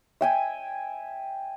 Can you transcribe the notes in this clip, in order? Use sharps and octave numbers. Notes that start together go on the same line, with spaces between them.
E5 G5 G#5